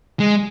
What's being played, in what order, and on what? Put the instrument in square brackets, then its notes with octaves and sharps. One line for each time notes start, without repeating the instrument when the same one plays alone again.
[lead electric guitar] G#3